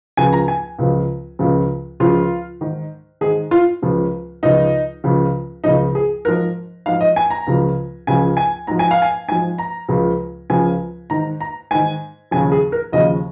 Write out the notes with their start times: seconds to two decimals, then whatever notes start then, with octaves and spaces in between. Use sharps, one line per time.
0.17 C#2 C#3 F3 G#5
0.33 A#5
0.48 G#5
0.78 C#2 C#3 F3
1.39 C#2 C#3 F3
2.00 C#2 C#3 F3 F4
2.61 G#2 D#3
3.21 G#2 D#3 G#4
3.51 F4
3.82 C#2 C#3 F3
4.43 C#2 C#3 F3 D#4
5.04 C#2 C#3 F3
5.64 C#2 C#3 F3 D#4
5.95 G#4
6.25 G#2 F3 A#4
6.86 G#2 F3 F5
7.01 D#5
7.16 G#5
7.30 A#5
7.47 C#2 C#3 F3
8.07 C#2 C#3 F3 G#5
8.37 G#5
8.67 G#2 F3 A#5
8.79 G#5
8.91 F5
9.02 G#5
9.28 G#2 F3 G#5
9.58 A#5
9.89 C#2 C#3 F3
10.50 C#2 C#3 F3 G#5
11.10 G#2 D#3 A#5
11.40 A#5
11.71 G#2 D#3 G#5
12.31 D#2 C#3 F3 G#5
12.52 G#4
12.72 A#4
12.92 D#2 C#3 F3 D#5